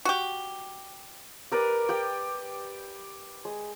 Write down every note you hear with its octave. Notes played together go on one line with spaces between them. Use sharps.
F#4 G4
G4 A#4 B4 D5
G4 B4 G5
G#3